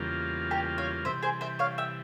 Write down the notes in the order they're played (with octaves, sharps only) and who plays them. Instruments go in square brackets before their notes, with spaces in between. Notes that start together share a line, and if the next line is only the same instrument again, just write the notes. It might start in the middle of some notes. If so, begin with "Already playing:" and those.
Already playing: [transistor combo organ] E2 C#3 G3 A#3 F4
[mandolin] G4 A#4
C#5 F5
[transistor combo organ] C3 E3 G3 [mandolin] C5 E5
[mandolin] G#4 C5
C5 E5
C#5 F5
E5 G5